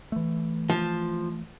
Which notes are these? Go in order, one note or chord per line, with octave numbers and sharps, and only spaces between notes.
E3 A3
F3